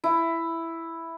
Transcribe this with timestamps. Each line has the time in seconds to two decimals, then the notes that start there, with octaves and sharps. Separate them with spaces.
0.04 E4